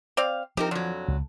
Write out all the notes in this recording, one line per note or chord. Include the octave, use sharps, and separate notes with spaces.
C4 D5 F5
F3 C4 D#4 G4 A#4
F2 D3 F#3
C#2